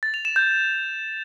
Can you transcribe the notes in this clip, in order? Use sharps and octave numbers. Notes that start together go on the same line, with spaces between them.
A6
F7
E7
G6